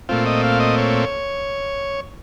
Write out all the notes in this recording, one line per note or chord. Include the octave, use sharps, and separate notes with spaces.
A#2 A3 C4 F4
D#5
F5
D#5
C#5